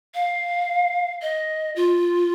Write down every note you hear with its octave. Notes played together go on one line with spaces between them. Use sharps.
F5
D#5
F4